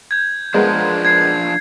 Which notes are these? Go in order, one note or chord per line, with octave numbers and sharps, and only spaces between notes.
G6 G#6
F3 G#3 B3 D4 A#4 C5
G#6 C7